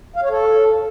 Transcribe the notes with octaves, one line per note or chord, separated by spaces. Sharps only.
F5
C#5
A4